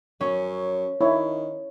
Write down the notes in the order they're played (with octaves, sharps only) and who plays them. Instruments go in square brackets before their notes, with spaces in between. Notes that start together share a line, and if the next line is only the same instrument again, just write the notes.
[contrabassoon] F#2 [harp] C#4
[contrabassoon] D#3 [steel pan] E4 C#5